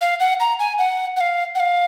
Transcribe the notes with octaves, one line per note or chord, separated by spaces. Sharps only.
F5
F#5
A#5
G#5
F#5
F#5
F5
F#5
F5